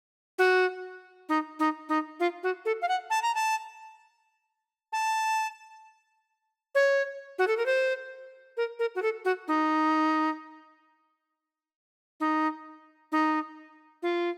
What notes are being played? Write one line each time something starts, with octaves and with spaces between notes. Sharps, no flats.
F#4
D#4
D#4
D#4
F4
F#4
A4
F5
F#5
A5
A#5
A5
A5
C#5
F#4
A4
A#4
C5
A#4
A#4
F#4
A4
F#4
D#4
D#4
D#4
F4